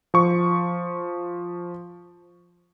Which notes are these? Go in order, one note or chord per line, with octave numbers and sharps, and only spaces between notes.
F3 C#6